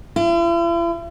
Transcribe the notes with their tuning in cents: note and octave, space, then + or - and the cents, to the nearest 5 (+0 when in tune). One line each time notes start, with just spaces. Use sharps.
E4 +45